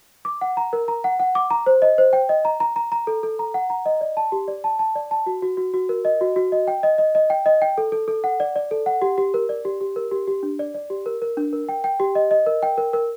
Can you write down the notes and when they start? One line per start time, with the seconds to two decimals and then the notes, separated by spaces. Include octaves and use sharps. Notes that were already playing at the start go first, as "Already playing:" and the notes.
0.25 D6
0.41 F#5
0.57 A#5
0.73 A#4
0.88 A#5
1.04 F#5
1.20 F#5
1.35 D6
1.51 A#5
1.66 C5
1.82 D#5
1.98 C5
2.13 G5
2.29 D#5
2.45 A#5
2.60 A#5
2.76 A#5
2.92 A#5
3.07 A4
3.23 A4
3.39 A#5
3.54 F#5
3.70 A#5
3.86 D#5
4.01 D5
4.17 A5
4.32 G4
4.48 D5
4.64 A5
4.79 A5
4.95 D5
5.11 A5
5.26 F#4
5.42 F#4
5.57 F#4
5.74 F#4
5.89 A#4
6.05 D#5
6.21 F#4
6.36 F#4
6.52 D#5
6.67 G5
6.83 D#5
6.98 D#5
7.15 D#5
7.30 G5
7.46 D#5
7.62 G5
7.78 A4
7.92 A4
8.08 A4
8.24 F#5
8.40 D5
8.56 D5
8.71 A4
8.86 F#5
9.02 G4
9.18 G4
9.34 A#4
9.49 D5
9.65 G4
9.81 G4
9.96 A#4
10.11 G4
10.27 G4
10.43 D4
10.59 D5
10.74 D5
10.90 G4
11.06 A#4
11.22 A#4
11.37 D4
11.53 A#4
11.69 G5
11.84 G5
12.00 G4
12.15 D#5
12.31 D#5
12.46 A#4
12.63 G5
12.78 A#4
12.93 A#4